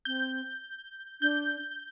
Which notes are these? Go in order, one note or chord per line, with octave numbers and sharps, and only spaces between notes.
C4 G6
D4 G6